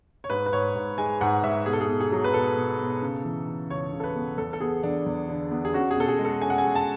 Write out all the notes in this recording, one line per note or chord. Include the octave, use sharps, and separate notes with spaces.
C#5
G#2 B4
B4
G#2 C#5
G#2
G#3 G#5
G#2 F#5
G#2 E5
B2 G#4
A4
G#4
B2
G#4
F#3
B4
B2 A4
B2
B2
C#3
E3
C#3
C#2 C#5
C#3
A4
B4
B3
E2 A4
A4
B3 G#4
E2 D4
E2
D3
B3
G#4
C#4 F#4
G#4
B2 A4
G#4
G#3
A4
C#4 G#5
F#5
G#5
G#3
A5